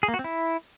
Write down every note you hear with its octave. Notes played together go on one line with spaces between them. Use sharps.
G#4
A#3
F#4
C4
E4